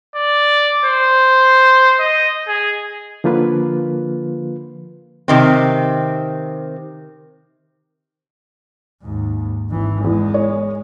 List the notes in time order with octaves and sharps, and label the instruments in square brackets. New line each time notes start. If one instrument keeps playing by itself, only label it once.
[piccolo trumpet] D5
C5
D#5
G#4
[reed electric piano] D3 F3 A#3 F4 B4
[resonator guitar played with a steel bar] C3 D#3 C4
[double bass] D#2 G#2
G#1 E3
[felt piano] E2 [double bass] G#3
[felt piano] C#5